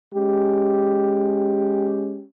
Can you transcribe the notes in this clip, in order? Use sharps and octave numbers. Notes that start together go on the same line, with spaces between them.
G#3 C#4 G4